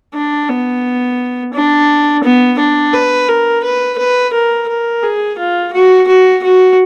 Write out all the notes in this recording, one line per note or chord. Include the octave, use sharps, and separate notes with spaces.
D4
B3
D4
B3
D4
B4
A#4
B4
B4
A#4
A#4
G#4
F4
F#4
F#4
F#4